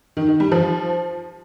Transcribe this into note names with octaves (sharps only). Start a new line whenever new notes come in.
D#3
D#3
G3
F3